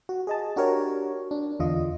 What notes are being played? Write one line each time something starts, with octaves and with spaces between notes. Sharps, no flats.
F#4
G#4 D#5 A5
D4 F#4 G4 A#4 C#5
D4
E2 D3 F4 D#5